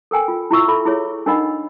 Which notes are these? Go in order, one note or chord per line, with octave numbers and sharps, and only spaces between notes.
A4 A#4 G5 G#5
F4
E4 F4 E5 C#6 E6
A4 E5 B5
E4 G#4 C#5 E5
D4 D#4 A#4 D#5 F#5 B5